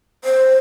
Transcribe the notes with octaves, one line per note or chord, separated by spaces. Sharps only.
C5